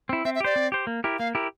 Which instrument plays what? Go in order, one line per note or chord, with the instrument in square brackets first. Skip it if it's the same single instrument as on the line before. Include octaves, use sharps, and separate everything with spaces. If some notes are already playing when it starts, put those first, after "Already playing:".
[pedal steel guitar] C4 E4
[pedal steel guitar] C4 [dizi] E5
[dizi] E5
[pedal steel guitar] G4 C5 [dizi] D5
[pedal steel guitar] C4
G4 C5
A#3
E4 G4 A#4
[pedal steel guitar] A#3 [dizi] F5
[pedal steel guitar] E4 G4 A#4